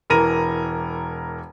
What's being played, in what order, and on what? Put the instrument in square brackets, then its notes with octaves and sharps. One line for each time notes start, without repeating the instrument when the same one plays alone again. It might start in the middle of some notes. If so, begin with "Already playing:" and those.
[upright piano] E1 E3 A#4 A#6 D#7